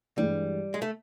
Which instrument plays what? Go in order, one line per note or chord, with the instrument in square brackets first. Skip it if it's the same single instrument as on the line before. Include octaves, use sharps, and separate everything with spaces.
[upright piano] G2 E3 G#3 [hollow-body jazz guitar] G3
[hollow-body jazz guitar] G#3
A3